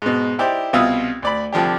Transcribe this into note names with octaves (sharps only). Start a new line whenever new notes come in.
G#2 B2
D#4 E4 G4 C5 D5
C2 B2 F4 E5 F5 D#6
D2 D5 B5
C2 D3 F3 D4 G4